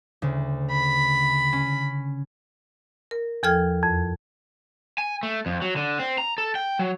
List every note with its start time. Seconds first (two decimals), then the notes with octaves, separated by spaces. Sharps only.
0.22 D2 C#3
0.71 B5
1.53 C#4
3.11 A#4
3.43 E2 F3 A4 G5 F6 G#6
3.83 F2
4.98 G#5
5.23 A3
5.46 F2
5.62 F#3
5.76 D3
5.99 C4
6.18 A#5
6.38 A4
6.55 G5
6.79 F#3